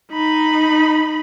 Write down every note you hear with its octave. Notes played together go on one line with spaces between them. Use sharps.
D#4 B5